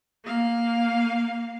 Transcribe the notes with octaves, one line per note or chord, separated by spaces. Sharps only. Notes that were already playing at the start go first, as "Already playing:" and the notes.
A#3 F5